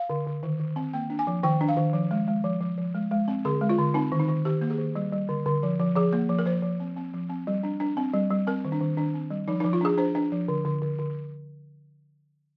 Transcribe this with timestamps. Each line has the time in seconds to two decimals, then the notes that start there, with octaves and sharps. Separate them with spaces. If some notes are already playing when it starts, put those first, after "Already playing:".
Already playing: F5
0.10 D3
0.27 D3
0.43 D#3
0.60 D#3
0.76 C4
0.94 A#3 G5
1.10 D4
1.19 G#5
1.27 F3
1.44 D#3 G5
1.61 D4
1.69 F5
1.77 D#3
1.93 F3
2.11 G#3
2.28 G#3
2.44 F3
2.61 F3
2.78 F3
2.94 G#3
3.11 G#3
3.28 C4
3.45 D3 G#4
3.61 G#3
3.69 F4
3.79 D3
3.94 C4 D#4
4.12 D#3
4.20 D#4
4.29 D#3
4.45 D#3 G4
4.61 A#3
4.70 G#4
4.78 D#3
4.95 G3
5.13 G3
5.29 D3
5.46 D3
5.63 F3
5.79 F3
5.95 F3 G#4
6.13 A#3
6.29 F3
6.39 A#4
6.46 F3 C5
6.63 F3
6.80 C4
6.97 C4
7.14 F3
7.30 C4
7.47 G3
7.63 D4
7.80 D4
7.97 C4
8.14 G3
8.30 G3
8.47 C4 A#4
8.65 D#3
8.72 D4
8.81 D#3
8.97 D#3 D4
9.14 C4
9.31 G3
9.48 F3 D#4
9.60 F3 D#4
9.73 F4
9.81 D4 G#4
9.98 D4 C5
10.15 D4
10.32 F3
10.48 D3
10.65 D3
10.82 D3
10.99 D3